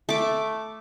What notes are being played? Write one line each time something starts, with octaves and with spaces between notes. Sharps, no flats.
A3 D6